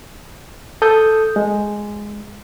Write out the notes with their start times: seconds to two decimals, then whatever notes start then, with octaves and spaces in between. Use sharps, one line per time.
0.82 A4 D#6 G6
1.36 G#3